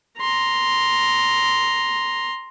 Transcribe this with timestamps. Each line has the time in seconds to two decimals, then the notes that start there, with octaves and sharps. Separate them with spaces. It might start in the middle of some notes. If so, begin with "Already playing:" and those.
0.20 A#5 C6